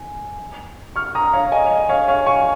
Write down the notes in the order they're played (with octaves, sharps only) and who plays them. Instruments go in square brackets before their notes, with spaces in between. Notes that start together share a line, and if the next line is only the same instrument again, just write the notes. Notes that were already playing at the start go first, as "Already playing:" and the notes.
Already playing: [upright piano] G#5
C#6 F6
A#5 D#6
C#5 F5
D#5 G#5
D#5
C#5 F5
C#5 F5
G#5 C#6